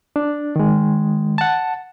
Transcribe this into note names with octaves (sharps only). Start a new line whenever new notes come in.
D4
D#3 G#3
F#5 A5